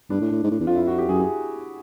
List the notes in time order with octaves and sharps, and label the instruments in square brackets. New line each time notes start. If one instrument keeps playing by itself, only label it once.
[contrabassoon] G2 [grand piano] D4
[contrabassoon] A2
A2
G#2
A2
E2
[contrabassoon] F2 [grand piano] F4
[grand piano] E4
F#4
G4
[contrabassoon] F#2 [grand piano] G#4
[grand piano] G#4